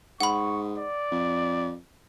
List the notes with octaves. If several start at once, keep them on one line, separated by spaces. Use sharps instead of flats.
G#2 F#5 B5 C#6
D5
F2